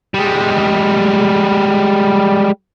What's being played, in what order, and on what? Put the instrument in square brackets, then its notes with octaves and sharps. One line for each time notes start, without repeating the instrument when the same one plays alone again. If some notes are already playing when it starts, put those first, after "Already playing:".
[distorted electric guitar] G3 G#3